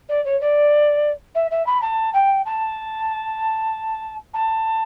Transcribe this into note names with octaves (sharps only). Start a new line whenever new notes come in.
D5
C#5
D5
E5
E5
B5
A5
G5
A5
A5